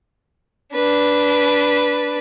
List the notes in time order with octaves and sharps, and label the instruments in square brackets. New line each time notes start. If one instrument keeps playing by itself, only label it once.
[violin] D4 B4